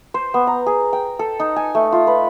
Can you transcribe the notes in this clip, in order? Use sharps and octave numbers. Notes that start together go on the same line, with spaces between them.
C5
B3
A#5
G#4
G5
A4
D#4
G#5
A3
F4
B4